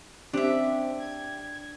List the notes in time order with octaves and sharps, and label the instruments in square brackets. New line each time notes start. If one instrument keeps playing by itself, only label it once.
[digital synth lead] C4 [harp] D4 [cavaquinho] G4 E5
[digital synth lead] G#6